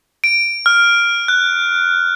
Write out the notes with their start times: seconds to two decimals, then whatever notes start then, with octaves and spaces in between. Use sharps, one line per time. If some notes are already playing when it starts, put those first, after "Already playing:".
0.24 D7
0.66 F6
1.28 F#6